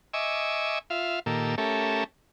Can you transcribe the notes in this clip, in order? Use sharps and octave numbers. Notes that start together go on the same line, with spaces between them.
D#5 E5 G#5 C#6 D6 E6
F4 E5 F5
A#2 D#3 A#3 G4 A4 E6
A3 C#4 G4 A4 A#4 E5